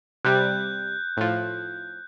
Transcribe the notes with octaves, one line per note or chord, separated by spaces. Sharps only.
C3 G3 F#6 G6
A2 F3